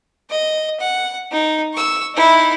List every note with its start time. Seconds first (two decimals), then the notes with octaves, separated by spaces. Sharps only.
0.31 D#5
0.80 F#5
1.32 D#4
1.74 C#6 E6
2.15 D#4 E4